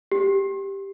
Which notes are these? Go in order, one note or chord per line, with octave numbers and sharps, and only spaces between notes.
G4